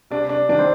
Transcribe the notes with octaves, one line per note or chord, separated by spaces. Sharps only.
C3 D4
D4
D#3 D4
C4